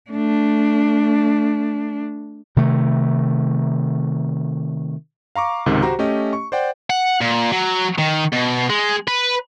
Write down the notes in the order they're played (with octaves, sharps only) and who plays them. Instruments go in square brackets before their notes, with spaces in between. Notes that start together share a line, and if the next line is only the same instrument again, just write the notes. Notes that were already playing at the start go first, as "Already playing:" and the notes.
[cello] A3 D4
[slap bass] C3 D#3 A3
[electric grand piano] F5 A#5 C#6 D6
C#2 G#2 C3 D#3
F#4 G4 C5 A#5
A3 C#4 G4 D#5
C#6
C5 D5 F#5 G5
[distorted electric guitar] F#5
A#2
F#3
D#3
B2
G#3
B4